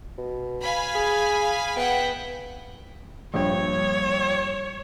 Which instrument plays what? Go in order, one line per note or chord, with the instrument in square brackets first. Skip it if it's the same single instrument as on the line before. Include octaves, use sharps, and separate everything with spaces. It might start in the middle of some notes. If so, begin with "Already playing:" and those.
[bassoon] B2
[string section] F5 G#5 B5
[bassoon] G#4
[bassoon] B3 [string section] E5 F#5 G5
[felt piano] A#1 G2 G5 [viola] C#5